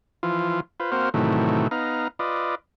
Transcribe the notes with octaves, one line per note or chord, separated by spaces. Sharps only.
E3 F3 F4
F4 B4 C5
A#3 C4 F#4 C5 F5
A2 C3 D#3 E3 F#3 A3
B3 D#4 F5 A#5
F4 B4 D5 D#5